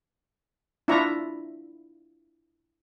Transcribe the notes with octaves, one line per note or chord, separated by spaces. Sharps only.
D4 E4 F4 E5 A#5 C#6